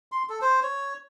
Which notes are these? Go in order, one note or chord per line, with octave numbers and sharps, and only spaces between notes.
C6
A4
C5
C#5